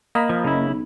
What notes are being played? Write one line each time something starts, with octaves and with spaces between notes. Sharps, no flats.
A#3 D#5 A#5 B5
F3
F#1 C#3 E4
B1